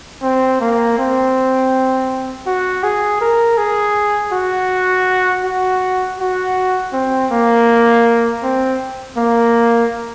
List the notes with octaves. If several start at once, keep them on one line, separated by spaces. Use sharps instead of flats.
C4
A#3
C4
F#4
G#4
A#4
G#4
F#4
F#4
F#4
C4
A#3
C4
A#3